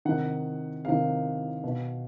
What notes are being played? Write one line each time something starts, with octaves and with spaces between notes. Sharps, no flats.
C3 D#3 F#5
C3 D#3 F5
B2